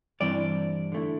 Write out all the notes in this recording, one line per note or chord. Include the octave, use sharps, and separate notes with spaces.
G2 E3 G3 C4 E4 D5
D3 A3 E4